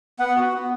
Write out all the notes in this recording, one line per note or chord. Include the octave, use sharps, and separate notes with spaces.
B3 F#5
F#4
B3